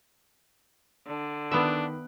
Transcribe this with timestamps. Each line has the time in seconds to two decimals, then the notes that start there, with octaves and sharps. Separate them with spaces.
1.07 D3
1.51 D#3 B3 D4 E5 B5 F#6